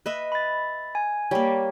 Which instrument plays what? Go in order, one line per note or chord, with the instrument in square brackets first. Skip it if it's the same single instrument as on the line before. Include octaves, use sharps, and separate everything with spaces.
[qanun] B4 D#5 E5
[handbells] B5 A6
G#5
[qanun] G3 A#3 [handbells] C#5